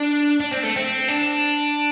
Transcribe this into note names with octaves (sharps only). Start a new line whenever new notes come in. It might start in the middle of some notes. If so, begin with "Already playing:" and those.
Already playing: D4
D4
C4
A3
C4
D4